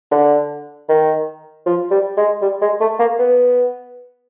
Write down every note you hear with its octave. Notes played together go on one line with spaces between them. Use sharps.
D3
D#3
F3
G3
G#3
G3
G#3
A3
A#3
B3